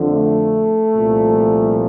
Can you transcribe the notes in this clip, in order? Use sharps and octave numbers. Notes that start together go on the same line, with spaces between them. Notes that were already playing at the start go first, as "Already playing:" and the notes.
Already playing: F2 D3 F3
A3
C2 A#2 F3